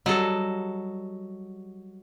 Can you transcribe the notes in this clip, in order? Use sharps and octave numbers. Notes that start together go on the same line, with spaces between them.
F#3 G3 A4 D#5